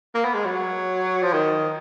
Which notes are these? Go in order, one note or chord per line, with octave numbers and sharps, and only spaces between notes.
A#3
B3
G#3
F#3
F3
D#3